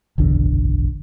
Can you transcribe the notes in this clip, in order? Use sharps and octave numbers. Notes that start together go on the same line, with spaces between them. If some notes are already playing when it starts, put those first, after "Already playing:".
F#1 B1 E2 D3